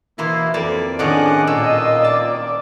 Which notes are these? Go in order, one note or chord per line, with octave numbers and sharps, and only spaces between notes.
B2 E3 A#3 E4 C6
F2 A#3 D5 A5
A2 D#3 C#4 D4 G#4 D5 D#5 F#5
A#2 A#3 F4 D#5 E6
D5 A5